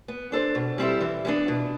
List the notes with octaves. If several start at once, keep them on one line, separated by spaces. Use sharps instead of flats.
B3
D4 A4 C5
B2
G3 C4 E4 A4
E3
G3 B3 D4
B2